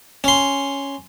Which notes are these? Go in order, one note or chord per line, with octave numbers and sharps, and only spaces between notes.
C#4 C6